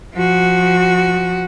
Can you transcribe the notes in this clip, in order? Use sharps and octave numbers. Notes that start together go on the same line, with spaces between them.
F3 F#4